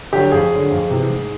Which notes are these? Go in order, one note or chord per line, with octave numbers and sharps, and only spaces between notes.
D3 F#3 G4
F2 G#4
D3 F#3
F2
C3 E3
G#2